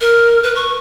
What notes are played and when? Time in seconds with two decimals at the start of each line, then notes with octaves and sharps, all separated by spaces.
0.01 A#4
0.43 B4
0.56 C#6